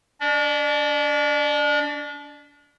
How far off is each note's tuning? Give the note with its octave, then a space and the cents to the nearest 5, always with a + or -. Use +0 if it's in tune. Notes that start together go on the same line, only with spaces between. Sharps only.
D4 -35 D5 +30